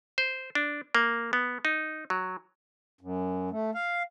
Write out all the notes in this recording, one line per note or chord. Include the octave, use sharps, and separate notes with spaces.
C5
D4
A#3
B3
D#4
F#3
F#2
A3
F5